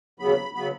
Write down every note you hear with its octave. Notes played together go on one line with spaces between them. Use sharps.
D#2 C#3 F#3 B3 B5
C#3 F#3 B3 B5